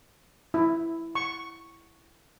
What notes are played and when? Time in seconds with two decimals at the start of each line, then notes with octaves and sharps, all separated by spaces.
0.54 E4
1.15 C#6